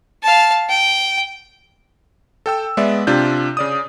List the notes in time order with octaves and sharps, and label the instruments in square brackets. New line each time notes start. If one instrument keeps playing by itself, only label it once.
[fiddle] F5 A5
G5
[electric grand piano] A4 G5 E6
G#3 B3 D5 E5
C3 D4 F4 G6
C#3 D5 D#6